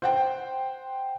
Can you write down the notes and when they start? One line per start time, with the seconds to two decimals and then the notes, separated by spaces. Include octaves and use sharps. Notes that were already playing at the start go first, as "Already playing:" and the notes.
0.02 C5 F#5 G5